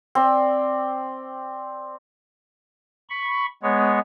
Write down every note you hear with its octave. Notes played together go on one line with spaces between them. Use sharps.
C4 D5
B5 C#6
G#3 B3 C#5